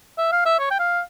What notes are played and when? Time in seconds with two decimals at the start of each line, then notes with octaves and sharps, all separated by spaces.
0.18 E5
0.32 F5
0.46 E5
0.59 C#5
0.70 G5
0.79 F5